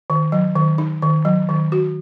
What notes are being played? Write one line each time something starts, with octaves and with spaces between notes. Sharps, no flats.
D#3
F#3
D#3
D#4
D#3
F#3
D#3
F#4